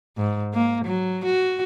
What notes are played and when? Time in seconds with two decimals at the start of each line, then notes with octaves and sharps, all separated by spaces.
0.18 G#2
0.54 A#3
0.85 F#3
1.25 F#4